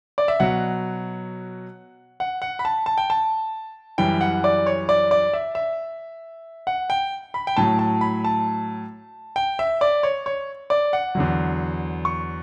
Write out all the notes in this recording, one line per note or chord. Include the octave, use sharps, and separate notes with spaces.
D5
E5
B2 F#3 F#5
F#5
F#5
B5
A5
A5
G5
A5
F#2 E3 G3 G5
F#5
D5
C#5
D5
D5
E5
E5
F#5
G5
B5
G5
A2 F#3 A5
A5
B5
A5
G5
E5
D5
C#5
C#5
D5
F#5
E2 D3 F#3
C#6